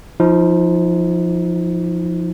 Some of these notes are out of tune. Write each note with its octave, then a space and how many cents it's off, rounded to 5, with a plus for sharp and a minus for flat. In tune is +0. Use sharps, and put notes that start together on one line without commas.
F3 +0 D#4 +35